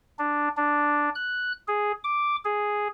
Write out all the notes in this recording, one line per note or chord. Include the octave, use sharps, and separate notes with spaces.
D4
D4
F#6
G#4
D6
G#4